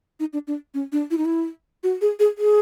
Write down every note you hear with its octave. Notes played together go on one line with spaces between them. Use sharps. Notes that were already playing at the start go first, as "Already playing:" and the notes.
D#4
D4
D4
C#4
D4
E4
D#4
E4
F#4
G#4
G#4
G#4